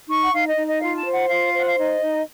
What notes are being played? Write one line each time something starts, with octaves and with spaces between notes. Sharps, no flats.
D#4 C#6
F#5
D#4 F5
D#5
D#4
D#5
F4 F5
A5
C5
F#5
F4 F5
C5 F#5
F5
D#4 D#5
D#4